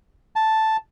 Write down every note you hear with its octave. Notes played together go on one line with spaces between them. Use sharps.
A5